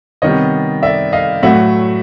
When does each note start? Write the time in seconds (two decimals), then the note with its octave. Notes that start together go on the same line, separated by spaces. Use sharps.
0.22 C3 D#3 G3 B3 C#5 D#5
0.83 D5 E5
1.13 D#5 F5
1.43 A2 F#3 A3 E5 F#5